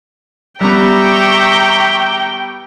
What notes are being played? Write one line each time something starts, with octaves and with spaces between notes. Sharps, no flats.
G3 B3 E5 G5 A#5 C#6 D6